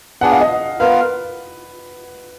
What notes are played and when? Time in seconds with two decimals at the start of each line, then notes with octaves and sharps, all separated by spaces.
0.21 B3 D4 G#4 F#5
0.32 F5
0.41 D#5
0.80 B3 F4 A#4 B4 F5